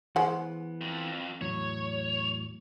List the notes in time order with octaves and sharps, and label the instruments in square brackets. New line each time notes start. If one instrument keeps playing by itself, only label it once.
[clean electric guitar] E3 B3 [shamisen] G#3 C5 F#5
[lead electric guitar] F2
[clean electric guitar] E2 A2 F#3 [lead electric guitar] C#5